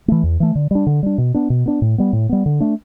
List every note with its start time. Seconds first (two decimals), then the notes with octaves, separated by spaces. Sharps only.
0.08 E3 A3
0.23 E2
0.40 E3 A3
0.55 D3
0.71 G3 D4
0.87 D3
1.03 G3 D4
1.18 B2
1.34 B3 D4
1.50 B2
1.66 B3 D4
1.82 A2
1.98 G3 B3
2.13 A2
2.29 G3 B3
2.46 D3
2.60 A3 D4